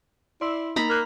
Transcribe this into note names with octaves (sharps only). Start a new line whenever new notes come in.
E4 D5 C6 E6
A#3 D#4 A#5 B5
A#3 F6 F#6 F7